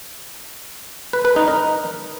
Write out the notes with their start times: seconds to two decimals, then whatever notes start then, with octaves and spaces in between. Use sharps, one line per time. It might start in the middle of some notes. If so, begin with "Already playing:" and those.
1.13 B4
1.25 B4
1.36 D#4
1.48 A#4